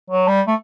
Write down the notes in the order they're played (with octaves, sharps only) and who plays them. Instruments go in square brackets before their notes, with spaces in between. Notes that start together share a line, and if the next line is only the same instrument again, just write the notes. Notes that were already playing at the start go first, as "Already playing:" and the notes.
[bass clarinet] F#3
G3
A3